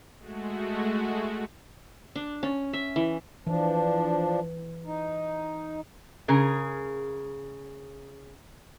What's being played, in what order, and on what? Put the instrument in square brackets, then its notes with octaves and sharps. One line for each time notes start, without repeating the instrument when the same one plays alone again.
[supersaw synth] G#3 A3 F#4
[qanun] D4
C#4
E5
E3
[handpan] E3 [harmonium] F3 D4
[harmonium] D#4
[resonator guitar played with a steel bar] C#3 G#4 A#4